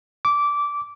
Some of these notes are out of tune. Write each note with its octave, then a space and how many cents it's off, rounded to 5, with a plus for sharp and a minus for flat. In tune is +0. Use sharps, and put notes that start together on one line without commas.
D6 -15